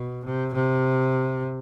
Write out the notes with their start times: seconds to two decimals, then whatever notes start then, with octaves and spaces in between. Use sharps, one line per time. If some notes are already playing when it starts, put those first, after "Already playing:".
Already playing: B2
0.25 C3
0.53 C3